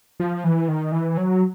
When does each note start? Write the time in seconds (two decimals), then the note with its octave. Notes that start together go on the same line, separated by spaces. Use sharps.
0.20 F3
0.44 E3
0.68 D#3
0.92 E3
1.17 F#3